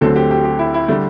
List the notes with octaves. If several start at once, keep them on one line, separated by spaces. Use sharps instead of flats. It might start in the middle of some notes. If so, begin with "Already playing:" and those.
D2 D3 F#3 C4 A4
G4
G4
G4
E4
E4
D3 G3 A3